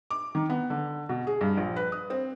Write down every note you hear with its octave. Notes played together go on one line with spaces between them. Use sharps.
D6
D#3
B3
D3
B2
G#4
G2
A#1
B4
D#6
C4